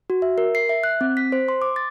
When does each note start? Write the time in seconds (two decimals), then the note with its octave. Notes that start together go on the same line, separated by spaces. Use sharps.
0.10 F#4
0.22 E5
0.38 A#4
0.55 C7
0.69 E5
0.84 F#6
1.01 C4
1.17 B6
1.32 C5
1.49 C6
1.62 D6
1.76 A6